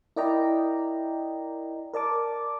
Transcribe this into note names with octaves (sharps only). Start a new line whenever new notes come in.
E4 A#4 D5 D#5 G5 A#5
A#4 D5 A5 D6